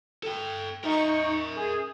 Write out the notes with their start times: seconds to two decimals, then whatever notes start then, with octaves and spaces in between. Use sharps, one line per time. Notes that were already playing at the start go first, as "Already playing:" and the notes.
0.23 A4 G5
0.85 D#4 A#4 E5 C#6
1.56 G#4